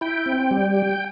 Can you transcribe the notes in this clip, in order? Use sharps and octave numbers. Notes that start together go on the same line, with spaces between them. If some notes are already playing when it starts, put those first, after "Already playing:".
E4 G5
C4
G3